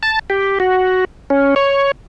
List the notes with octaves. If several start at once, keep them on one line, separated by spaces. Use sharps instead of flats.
A5
G4
F#4
C#4
C#5